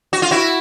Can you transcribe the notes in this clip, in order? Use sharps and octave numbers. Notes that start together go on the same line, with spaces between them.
F#4
F4
E4 F#4